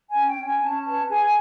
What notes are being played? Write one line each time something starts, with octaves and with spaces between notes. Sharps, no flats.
G#5
C#4
G5
C#4
G#5
C#4 A5
B4 A5
G#4 G#5
G#5